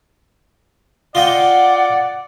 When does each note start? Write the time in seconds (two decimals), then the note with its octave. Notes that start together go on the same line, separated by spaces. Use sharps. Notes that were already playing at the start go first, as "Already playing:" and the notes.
1.15 F4 D5 D#5 F#5 G5